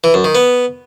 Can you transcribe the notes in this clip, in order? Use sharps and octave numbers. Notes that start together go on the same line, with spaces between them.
E3
F#2
D#3
B3